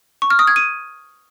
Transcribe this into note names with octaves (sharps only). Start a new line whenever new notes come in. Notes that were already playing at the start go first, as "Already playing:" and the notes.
C#6
F6
D#6
G#6
D#7